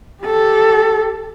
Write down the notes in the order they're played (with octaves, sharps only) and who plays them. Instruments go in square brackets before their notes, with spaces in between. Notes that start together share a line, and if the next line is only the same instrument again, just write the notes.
[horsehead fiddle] G4 A4